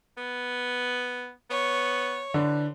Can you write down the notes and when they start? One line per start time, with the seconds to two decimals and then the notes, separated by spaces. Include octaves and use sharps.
0.17 B3
1.50 B3 C#5
2.34 D3 E3